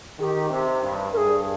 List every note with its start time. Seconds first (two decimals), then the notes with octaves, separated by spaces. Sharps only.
0.19 D#3 G#4
0.23 G4
0.50 C3
0.81 G2
1.11 G2 A#4
1.17 G#4